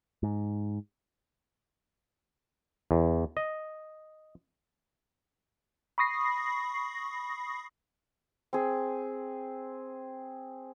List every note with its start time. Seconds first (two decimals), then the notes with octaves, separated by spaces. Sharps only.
0.23 G#2
2.91 E2
3.37 D#5
5.98 B5 C#6 D#6 A#6 C7
8.53 C4 G#4